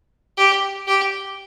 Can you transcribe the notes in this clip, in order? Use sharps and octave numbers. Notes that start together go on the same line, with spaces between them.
G4
G4